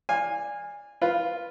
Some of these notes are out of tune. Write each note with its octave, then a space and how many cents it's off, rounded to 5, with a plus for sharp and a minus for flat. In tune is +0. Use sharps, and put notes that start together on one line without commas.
D5 +0 F5 +15 G#5 -20
F4 +0 B4 +0